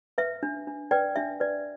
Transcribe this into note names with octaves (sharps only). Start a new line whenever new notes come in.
B4 E5
D4
D4
B4 D5 G5
D4 E5
B4 D5